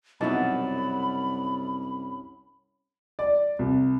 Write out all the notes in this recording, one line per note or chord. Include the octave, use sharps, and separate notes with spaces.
C2 F#2 B2 D#4 E4 A5 B5
D5
C2